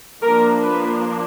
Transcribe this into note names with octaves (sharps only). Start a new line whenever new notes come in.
F3 A#3 D4 A#4
B4